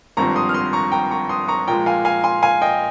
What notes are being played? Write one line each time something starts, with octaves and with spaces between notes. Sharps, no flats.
G#1 G2 F3 C4 A#5 C#6
C6 D#6
F6
C6 D#6
A#5 C#6
G5 A#5
A#5 C#6
C6 D#6
A#5 C#6
A#2 F3 G#3 G5 A#5
F5 G#5
F5 G#5
G#5 C6
F5 G#5
D#5 G5